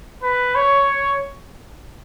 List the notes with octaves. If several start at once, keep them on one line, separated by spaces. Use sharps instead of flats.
B4
C#5